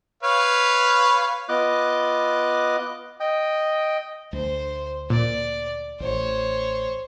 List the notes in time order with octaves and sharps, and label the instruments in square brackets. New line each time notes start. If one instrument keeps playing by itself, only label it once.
[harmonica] B4 C#5 F5
[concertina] B3 F4 D#5 D6 F#6
D#5 G5
[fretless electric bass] D2 [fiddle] C5
[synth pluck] A#2 [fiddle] D5
[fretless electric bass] A1 [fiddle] C5 C#5